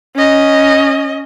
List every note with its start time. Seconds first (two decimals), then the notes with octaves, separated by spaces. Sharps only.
0.16 C#4 D#5